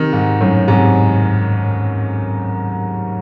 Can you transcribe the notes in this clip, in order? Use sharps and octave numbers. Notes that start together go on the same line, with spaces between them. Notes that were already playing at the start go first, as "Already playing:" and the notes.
Already playing: C3 D#3
G#2
F#2 A2
G#2 C3